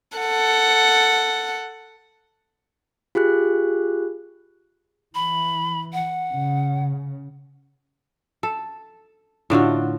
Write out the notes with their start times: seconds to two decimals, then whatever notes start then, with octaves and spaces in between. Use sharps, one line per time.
0.18 A4 F#5
3.15 F4 G4 G#4 F#6
5.15 E3 B5
5.93 F#5
6.32 C#3
8.43 A4
9.50 A2 D3 F4 F#4